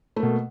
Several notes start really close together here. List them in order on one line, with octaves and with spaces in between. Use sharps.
A3 A#3 B2